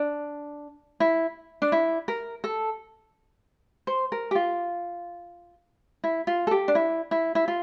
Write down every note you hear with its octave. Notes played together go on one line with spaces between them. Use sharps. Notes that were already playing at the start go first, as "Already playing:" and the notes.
Already playing: D4
E4
D4
E4
A#4
A4
C5
A#4
G4
F4
E4
F4
A4
G4
D4
E4
E4
E4
F4